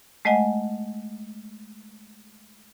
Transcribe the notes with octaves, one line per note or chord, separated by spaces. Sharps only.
G#3 A3 D#5 F#5 G#5